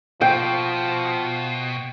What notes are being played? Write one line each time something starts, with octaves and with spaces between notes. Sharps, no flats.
B2 F3 G5